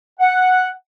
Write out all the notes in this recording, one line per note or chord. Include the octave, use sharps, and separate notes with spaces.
F#5